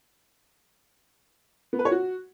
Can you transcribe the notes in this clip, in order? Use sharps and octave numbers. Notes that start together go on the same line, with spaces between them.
B3
B4
C#5
F#4